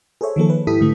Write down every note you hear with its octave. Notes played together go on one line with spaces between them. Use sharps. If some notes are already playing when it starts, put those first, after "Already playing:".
G#4 A4 C5 C#5 E5
D#3 F3 A#3 A4
B4
G#2 E4 G4 A4 D#6 B6
G#2 D3 A3